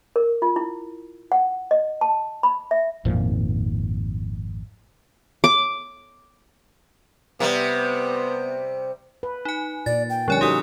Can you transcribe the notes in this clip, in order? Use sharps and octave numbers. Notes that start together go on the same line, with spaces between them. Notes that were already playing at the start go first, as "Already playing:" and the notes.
A#4
F4
E4
F#5
D#5
A5
B5
E5
G#1 F2 A#2 F3
D6
C3 G3 B3
B4
D#4 G#5
A#2 D5 A6
G5
D3 F3 G3 C#4 C#5 G#5
D#4 F#4 G4 A4 D5 F#5 D#6